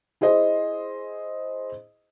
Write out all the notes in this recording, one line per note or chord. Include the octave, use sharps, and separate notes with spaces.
E4 G#4 C5 D#5